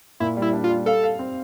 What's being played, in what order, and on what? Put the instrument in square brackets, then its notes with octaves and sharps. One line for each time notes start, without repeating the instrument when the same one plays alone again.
[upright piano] A#2 [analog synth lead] E4
[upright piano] G3
[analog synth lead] E4
[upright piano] D4
[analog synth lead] F4
[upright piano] G3
[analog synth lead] A4 [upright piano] F5
[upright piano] F5
C4